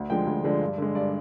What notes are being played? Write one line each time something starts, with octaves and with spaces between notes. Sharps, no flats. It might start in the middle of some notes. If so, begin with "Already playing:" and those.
Already playing: D2
D3 F3 G#3 G5
D2
D3 F3 G#3
G2
D3 G#3
G2 D5